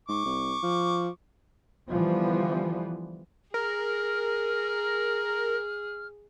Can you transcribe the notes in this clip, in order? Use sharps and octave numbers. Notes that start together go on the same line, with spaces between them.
G#2 C#6 D6
C2
F3
D3 E3 F3 G3 B3
G#4 A#4 F6